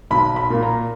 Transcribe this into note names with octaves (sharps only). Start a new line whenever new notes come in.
B1 B5
B5
A#2 A#3
A#5